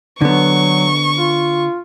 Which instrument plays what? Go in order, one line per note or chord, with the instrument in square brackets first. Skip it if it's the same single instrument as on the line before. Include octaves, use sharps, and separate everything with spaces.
[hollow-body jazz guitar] D3 B3 [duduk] F#3 [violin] C#6
[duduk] F4